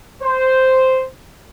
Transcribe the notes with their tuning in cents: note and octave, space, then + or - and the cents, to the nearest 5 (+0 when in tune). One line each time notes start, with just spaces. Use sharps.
C5 -5